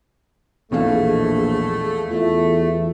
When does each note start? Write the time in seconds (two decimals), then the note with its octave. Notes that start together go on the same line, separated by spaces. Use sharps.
0.72 A#1 E2 B2 A3 G#4 F5
2.10 E2 A3 F4 E5